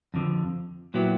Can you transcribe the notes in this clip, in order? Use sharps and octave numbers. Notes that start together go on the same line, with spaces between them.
F2 D3 F3
A#2 F#3 B3 E4 G4